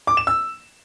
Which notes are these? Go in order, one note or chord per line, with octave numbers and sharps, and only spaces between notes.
D6
E7
E6